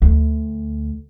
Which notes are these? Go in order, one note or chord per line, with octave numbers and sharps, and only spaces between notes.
D2